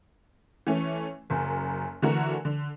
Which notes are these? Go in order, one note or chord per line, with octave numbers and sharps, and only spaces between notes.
E3 A3 C#4
F#1 F#2
D3 E3 A3 F#4 A#4
D3